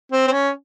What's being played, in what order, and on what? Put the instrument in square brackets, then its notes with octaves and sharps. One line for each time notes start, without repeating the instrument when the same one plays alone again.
[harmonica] C4
C4
C#4